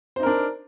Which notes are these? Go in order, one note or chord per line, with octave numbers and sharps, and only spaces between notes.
D4 D#4 A#4 C5